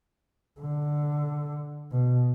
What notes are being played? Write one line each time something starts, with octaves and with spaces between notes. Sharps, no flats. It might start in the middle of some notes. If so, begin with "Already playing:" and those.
D3
B2